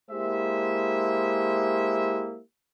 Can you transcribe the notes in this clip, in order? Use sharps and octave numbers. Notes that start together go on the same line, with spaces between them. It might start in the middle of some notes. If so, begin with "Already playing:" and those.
G#3 A#3 E4 G4 C5 E5